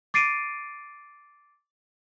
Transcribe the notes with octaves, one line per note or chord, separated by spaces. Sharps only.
D6 A6 C7 D7 D#7